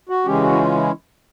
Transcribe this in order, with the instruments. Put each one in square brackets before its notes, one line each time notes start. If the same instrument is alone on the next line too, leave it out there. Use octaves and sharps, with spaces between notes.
[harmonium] F#4
C#3 E3 G#3 C#4 G4
F#4
E4
F4
E4